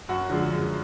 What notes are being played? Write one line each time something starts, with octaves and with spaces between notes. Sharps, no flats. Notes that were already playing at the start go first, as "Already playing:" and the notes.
F#2 F#4
D3 F3 G#3
F#2